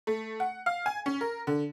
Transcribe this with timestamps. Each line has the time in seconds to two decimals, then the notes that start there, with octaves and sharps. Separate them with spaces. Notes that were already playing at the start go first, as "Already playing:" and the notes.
0.07 A3
0.40 F#5
0.66 F5
0.86 G#5
1.06 C#4
1.21 A#4
1.47 D3